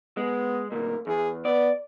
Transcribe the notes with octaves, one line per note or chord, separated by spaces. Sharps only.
G#3 B3
D2 A#2 A#4
E2 G#4
B3 D5